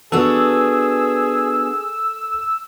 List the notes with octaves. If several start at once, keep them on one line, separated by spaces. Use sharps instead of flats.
B3 D4 F#4 G#4 A4 E6